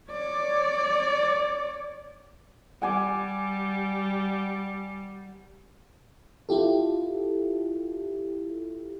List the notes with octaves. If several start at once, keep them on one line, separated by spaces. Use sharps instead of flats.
C#5 D5
G3 F#5 G#5 D6
E4 F4 G4 A4